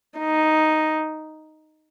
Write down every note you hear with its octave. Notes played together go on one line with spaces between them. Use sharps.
D#4